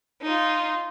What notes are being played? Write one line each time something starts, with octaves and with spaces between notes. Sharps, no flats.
D#4 F4